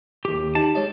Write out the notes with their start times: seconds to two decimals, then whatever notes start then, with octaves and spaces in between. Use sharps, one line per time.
0.25 D#2 G4
0.55 D#4 G4 A5
0.75 G#3 C#5 D#5